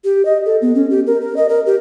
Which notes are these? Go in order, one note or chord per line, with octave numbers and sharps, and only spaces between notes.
G4
D#5
A4
B3
C#4
G4
A#4
A#4
D#5
A#4
G4